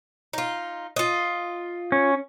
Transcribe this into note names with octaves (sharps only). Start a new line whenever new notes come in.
D#4 F4
F4 D#5
C#4